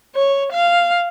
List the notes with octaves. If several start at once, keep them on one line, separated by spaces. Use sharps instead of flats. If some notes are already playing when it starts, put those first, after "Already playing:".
C#5
F5